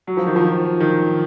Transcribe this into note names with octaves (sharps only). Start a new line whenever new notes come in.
F#3
F3
D#3
F3
D#3